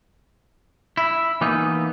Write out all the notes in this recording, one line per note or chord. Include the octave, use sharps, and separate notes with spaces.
E4
E3 A#3 B3 D#4